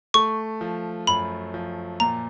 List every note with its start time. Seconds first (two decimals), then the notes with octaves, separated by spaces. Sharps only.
0.14 A3 C#6
0.61 F3
1.07 F#2 B5
1.54 F3
2.00 A#2 A#5